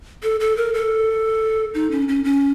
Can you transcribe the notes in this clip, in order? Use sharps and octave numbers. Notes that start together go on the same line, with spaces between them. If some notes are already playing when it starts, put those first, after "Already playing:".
A4
A4
A#4
A4
D#4
C#4
C#4
C#4